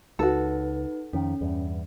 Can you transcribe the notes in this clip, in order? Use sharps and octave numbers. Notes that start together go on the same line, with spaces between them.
C#2 D#4 F#4 A4 B4
F2 D#3 C#4
E2 G2